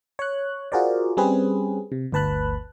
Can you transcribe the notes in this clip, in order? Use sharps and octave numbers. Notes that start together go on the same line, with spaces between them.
C#5 F#6
F4 F#4 G#4 A#4 C5 D5
G3 C4 C#4 G#4 B4
C3
G1 D2 B4 A5 B5 F#6